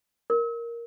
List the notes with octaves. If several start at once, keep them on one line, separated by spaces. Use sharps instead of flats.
A#4